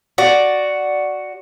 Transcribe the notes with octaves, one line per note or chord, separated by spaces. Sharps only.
F#4 D5